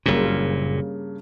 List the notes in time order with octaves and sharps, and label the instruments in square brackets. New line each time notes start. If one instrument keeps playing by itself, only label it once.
[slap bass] F#1 A#2 [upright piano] G2 C#3 A#3